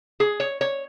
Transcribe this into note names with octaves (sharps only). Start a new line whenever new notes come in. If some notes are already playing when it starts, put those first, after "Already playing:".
G#4
C#5
C#5